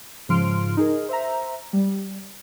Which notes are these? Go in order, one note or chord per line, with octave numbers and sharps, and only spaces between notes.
G#2 C#3 F3 C6 F6 D7
D#4 G#4 A#4
C5 E5 A#5
G3